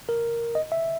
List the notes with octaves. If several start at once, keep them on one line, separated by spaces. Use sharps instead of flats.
A#4
D#5
E5